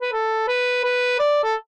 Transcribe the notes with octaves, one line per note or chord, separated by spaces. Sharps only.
B4
A4
B4
B4
D5
A4